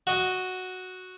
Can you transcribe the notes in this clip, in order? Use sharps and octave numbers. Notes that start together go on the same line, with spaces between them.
F#4 D#5